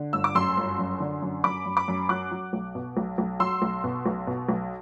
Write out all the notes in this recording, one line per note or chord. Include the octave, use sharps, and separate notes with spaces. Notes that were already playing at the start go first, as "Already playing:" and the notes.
Already playing: D3
G1 E6
D6
F#2 C6 E6
G1
F#2
D3
F#2
F#2 B5 D6
F#2
B5 D6
F#2
F#3 D6 F#6
F#3
B1
B2
B1
B1
F#3 C6 E6
B1
B2
B1
B2
B1